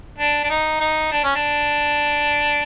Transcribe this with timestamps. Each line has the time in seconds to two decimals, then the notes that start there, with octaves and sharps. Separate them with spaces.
0.18 D4
0.44 D4
0.50 D#4
0.80 D#4
1.12 D4
1.24 C#4
1.35 D4